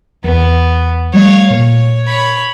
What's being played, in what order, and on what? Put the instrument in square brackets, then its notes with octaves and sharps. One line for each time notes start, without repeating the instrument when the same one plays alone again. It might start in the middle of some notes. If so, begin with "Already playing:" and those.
[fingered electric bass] E2 [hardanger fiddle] B3
[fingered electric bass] F3 G3 A3 [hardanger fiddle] C#5 F5
[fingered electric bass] A#2 [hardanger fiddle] C#5
[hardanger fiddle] C#5 B5